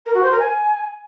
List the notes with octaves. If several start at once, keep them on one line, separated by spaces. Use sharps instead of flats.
A#4
F#4
C5
A#4
G#5